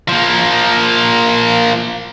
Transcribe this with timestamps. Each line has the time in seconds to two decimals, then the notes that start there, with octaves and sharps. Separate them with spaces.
0.09 F3 A#3